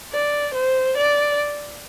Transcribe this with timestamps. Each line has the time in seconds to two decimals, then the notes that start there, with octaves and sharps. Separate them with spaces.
0.12 D5
0.54 C5
0.98 D5